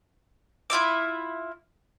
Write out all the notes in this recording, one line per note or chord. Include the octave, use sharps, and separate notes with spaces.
E4 F4 E5 D6